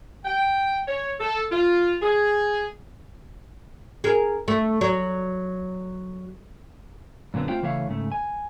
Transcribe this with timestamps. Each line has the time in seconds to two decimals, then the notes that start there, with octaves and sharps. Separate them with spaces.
0.24 G5
0.88 C#5
1.20 A4
1.51 F4
2.02 G#4
4.04 G#4 A#4
4.48 A3
4.81 F#3
7.34 F#2 A#2 D3 B3 C4
7.49 A3 C4 F4 C5 F5 G5
7.63 C#3 E3 A3 C#5 F5
7.87 G#2 C#3 A3
8.12 G#5